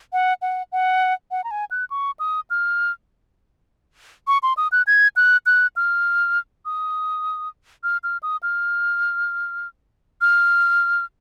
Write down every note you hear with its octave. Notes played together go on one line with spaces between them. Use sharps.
F#5
F#5
F#5
F#5
A#5
G#5
F#6
C#6
D#6
F6
C#6
C6
D#6
F#6
G#6
F#6
F#6
F6
D#6
F6
F6
D#6
F6
F6